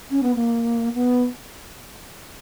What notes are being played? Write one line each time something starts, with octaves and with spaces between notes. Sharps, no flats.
C#4
B3
A#3
B3